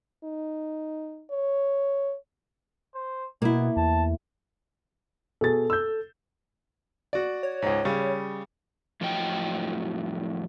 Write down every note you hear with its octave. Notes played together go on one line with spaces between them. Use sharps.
D#4
C#5
C5
B2 A#3 B3 E4
E2 A5
B2 G#4 A4 A6
E6 G6
F#4 D5
C#5
C#2 G#2
C#3 G3
F2 A2 F3 F#3 D#5 G5